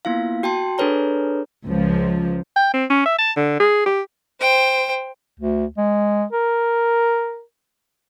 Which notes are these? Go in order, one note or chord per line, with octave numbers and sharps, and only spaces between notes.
A#3 B3 E4 F4 F5
F#4 G5 A5 C6
D4 G#4 A4 B4 C#5 A#5
C#2 F3
G5
C4
C#4
E5
A5
D3
G#4
G4
C5 G5
D2
G#3
A#4